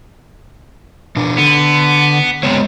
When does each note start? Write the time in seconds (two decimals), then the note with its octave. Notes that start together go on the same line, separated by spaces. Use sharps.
1.16 B2 D4
1.38 D3 B3
2.43 C#2 C3 G#3 B3 C#5